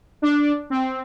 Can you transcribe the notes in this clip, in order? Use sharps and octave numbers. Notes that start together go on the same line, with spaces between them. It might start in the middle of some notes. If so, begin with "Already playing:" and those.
D4
C4